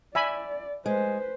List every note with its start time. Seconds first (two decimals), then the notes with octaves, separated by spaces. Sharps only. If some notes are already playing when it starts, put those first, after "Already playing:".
0.15 D5 E5 G#5 B5
0.86 G#3 B4 C5